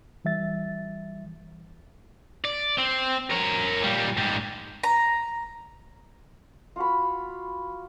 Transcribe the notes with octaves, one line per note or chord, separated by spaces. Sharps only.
E3 G3 E5 A6
D5
C4
A#4 C#5
A#2 G3
G#2 G3
A#5
F4 F#4 B5